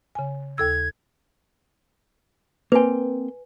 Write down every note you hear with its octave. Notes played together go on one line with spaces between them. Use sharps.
C#3 G#5
D#2 A4 E6 G#6
A#3 C4 B4 G5 G#5